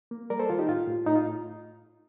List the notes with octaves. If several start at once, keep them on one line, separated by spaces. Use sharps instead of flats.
A#3
G3 A#4 D5
A4 C5
D#3 F4
D#4 G4
A2 F4
A2
A2 D#4
F4